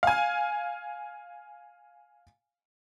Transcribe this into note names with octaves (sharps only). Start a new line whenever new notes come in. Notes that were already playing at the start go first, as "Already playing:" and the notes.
F5 G#5